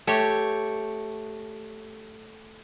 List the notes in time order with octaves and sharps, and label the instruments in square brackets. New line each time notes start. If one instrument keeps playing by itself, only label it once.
[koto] A3 G4 C#5